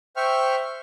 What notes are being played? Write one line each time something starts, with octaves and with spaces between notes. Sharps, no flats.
C5 E5 G5 C#6 F6